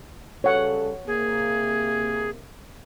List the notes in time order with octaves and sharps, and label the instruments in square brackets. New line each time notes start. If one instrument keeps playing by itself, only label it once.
[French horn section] C#3 G3 A4 [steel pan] C#5 F#5
[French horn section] C3 A#3 [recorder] G#4